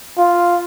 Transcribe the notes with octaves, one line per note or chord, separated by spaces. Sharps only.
F4